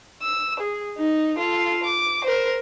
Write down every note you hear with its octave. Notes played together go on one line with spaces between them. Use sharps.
E6
G#4
D#4
F4 A4
D6
A#4 C5